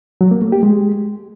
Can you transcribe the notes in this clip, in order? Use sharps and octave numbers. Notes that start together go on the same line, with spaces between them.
F#3
A#3
A3
G4
G#3